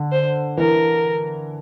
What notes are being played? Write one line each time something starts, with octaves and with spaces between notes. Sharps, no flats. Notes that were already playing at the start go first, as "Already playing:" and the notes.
Already playing: D3
C5
E3 A#4